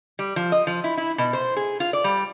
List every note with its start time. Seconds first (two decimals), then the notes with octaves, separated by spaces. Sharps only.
0.19 G3
0.36 F3
0.52 D#5
0.67 F3
0.84 E4
0.97 E4
1.18 B2
1.33 C5
1.56 G#4
1.80 F4
1.93 D5
2.04 G3